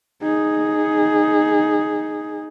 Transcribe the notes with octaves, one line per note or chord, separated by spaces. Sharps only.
D#4 G#4